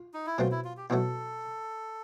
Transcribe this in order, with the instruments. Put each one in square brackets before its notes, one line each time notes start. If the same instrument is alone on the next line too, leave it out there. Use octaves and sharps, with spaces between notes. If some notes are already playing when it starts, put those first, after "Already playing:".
Already playing: [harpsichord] F4
[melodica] D#4
E4
[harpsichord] B2 F#3 A3 C4 [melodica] F4
[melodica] E4
F4
G4
[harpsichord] E2 B2 F#3 A3 [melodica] A4